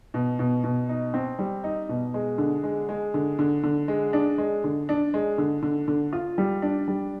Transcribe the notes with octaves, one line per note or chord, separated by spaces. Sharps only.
B2
B2
B2
D#4
C4
G3
D#4
B2
G#3
D3
G#3
G#3
D3
D3
D3
G#3
D4
G#3
D3
D4
G#3
D3
D3
D3
F4
G3
D4
G3